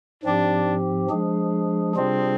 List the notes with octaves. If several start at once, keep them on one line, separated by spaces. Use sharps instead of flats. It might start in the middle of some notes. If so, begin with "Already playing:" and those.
G#2 F3 C4 D4 G4
F3 G#3 D4 G#4
C3 G3 C4 D4 F4 G#4